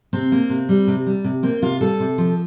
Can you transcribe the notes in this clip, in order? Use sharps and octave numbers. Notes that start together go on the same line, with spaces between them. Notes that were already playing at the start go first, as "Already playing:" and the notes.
C3 C4
A#3
C3
G3
C3
G3
C3
A#3 C4
C3 F4
G3 A4
C3
F3